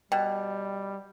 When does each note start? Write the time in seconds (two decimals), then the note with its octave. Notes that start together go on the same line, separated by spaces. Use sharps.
0.12 B2 G3 G5